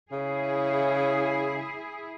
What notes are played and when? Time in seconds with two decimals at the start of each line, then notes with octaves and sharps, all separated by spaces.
0.12 C#3 E4 G#4